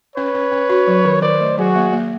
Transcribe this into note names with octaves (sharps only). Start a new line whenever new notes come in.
C#4 B4 C#5
C#4
C#4
F#4
F#3
D#3
D#3 C5 D5
A3
F#3 F#4 G#4
A#3
A#3